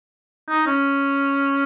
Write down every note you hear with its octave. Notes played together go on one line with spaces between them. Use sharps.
D#4
C#4